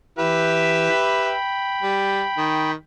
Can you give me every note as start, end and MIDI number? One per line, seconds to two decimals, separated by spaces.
0.18 0.89 52
0.18 1.33 67
0.18 1.33 71
0.18 1.33 76
0.89 2.71 79
0.89 2.71 83
1.83 2.23 55
2.38 2.73 51